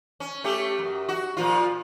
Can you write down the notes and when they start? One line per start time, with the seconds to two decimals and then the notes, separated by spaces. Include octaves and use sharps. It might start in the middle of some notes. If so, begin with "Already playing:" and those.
0.20 C#4
0.44 A3 C#4 G4
0.79 F#2
1.08 F#4
1.37 A#2 F3 F4